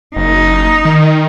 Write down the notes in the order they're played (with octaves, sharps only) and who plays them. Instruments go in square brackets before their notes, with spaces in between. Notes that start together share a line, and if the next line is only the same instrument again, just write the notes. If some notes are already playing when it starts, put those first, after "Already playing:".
[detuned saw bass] F#1 [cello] D#4
[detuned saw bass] D#3